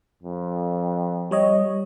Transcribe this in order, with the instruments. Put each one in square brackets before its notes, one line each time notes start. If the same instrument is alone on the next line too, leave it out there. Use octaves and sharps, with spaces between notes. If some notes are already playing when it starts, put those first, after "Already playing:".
[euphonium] F2
[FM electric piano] G3 C#5 D#5